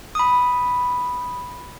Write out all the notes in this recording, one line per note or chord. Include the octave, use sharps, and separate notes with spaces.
B5 D#6